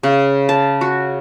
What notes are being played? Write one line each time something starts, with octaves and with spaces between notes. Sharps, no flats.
C#3
A5
F#4